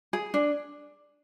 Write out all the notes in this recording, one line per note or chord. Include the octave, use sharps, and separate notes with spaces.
G#4
D4